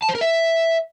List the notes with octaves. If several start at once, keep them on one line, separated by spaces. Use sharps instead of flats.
A5
C5
A#4
E5